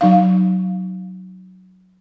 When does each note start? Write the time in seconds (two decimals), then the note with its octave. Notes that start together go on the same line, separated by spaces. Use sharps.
0.01 F#3 D#4 F5